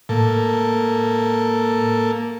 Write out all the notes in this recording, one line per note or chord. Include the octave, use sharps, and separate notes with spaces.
A2 A#3 A4